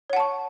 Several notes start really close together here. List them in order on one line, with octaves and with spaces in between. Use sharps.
C#5 F#5 A5 C#6